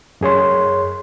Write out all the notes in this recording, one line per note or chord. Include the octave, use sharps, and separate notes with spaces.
F#2 G#4 C#5 C6